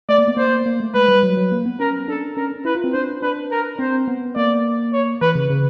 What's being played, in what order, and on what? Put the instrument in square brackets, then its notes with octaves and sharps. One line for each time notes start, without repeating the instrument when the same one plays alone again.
[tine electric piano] A3 [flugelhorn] D5
[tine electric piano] A#3
B3
[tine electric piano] A#3 [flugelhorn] C5
[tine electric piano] A#3
A3
[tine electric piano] G#3 [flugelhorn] B4
[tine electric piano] G3
F#3
F#3
A#3
B3
[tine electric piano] C#4 [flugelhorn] A#4
[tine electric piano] D4 [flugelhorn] A4
[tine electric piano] C#4 [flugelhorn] A#4
[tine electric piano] E4 [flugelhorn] B4
[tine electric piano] F4
C4
[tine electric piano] D4 [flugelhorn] C5
[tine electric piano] D4 [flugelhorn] B4
[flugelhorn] A#4
[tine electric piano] C4 [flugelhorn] C5
[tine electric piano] B3
[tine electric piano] A#3 [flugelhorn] D5
[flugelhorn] C#5
[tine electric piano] E3 [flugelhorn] B4
[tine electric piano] C#3
C#3